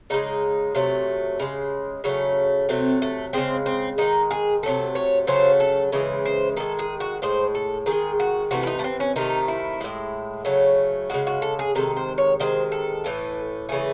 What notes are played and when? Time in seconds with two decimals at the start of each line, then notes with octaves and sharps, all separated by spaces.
0.10 C#3 G#3 D#4
0.75 C3 F#3 A3
1.40 C#3 G#3
2.04 C#3 F#3 A3
2.69 C3 F#3 A3 C4
3.02 A3
3.33 C#3 G#3 C4
3.66 C4
3.98 D#3 G#3 D#4
4.31 G#4
4.63 C3 F#3 A3 A4
4.95 C#5
5.27 C#3 F#3 A3 C5
5.60 A4
5.92 C#3 E3 G#3
6.25 C5
6.57 D#3 G#3 A4
6.79 G#4
7.00 F#4
7.22 A2 G#3 C5
7.55 A4
7.86 D#3 G#3 G#4
8.20 F#4
8.51 C3 E3 A3 F#4
8.63 E4
8.67 D#4
8.79 A3
8.84 C4
9.00 C#4
9.16 C3 D#3 A3 D#4
9.48 E4
9.81 A2 G#3
10.45 C#3 F#3 A3
11.10 C#3 G#3 F#4
11.27 F#4
11.42 A4
11.59 G#4
11.75 C3 D#3 G#3 A4
11.97 C5
12.18 C#5
12.40 C3 D#3 G#3 C5
12.72 A4
13.04 A2 E3 A3
13.69 C#3 E3 A3 G#4